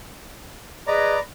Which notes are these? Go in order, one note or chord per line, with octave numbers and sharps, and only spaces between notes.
G#4 B4 D5 D#5 A#5